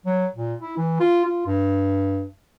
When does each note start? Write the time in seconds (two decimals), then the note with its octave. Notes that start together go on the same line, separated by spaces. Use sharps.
0.06 F#3
0.35 A#2
0.60 E4
0.77 E3
1.00 F4
1.25 F4
1.46 G2